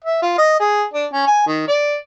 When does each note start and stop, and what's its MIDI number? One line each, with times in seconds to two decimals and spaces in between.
0.04 0.21 76
0.22 0.34 65
0.38 0.56 75
0.60 0.84 68
0.93 1.06 62
1.13 1.24 61
1.27 1.44 80
1.47 1.64 51
1.68 1.97 74